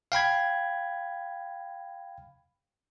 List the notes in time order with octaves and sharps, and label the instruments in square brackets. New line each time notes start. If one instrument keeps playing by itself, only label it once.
[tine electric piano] F5 G5 B5 G#6